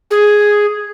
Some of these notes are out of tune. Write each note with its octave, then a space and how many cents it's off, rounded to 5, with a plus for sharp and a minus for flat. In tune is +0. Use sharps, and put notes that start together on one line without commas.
G#4 +0